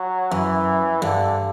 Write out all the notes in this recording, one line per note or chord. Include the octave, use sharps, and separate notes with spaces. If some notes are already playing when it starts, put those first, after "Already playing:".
Already playing: F#3
F#2 E3
G2 D3